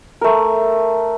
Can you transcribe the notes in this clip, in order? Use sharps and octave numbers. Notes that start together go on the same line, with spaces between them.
A3 A#4